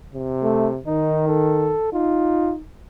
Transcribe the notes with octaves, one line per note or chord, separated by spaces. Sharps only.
C3
A3
D#3 D#4
A4
D#4 F4